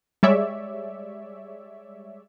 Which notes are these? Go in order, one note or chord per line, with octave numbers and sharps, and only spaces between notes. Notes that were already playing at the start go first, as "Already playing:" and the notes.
G3 G#3 C#5 D5 E5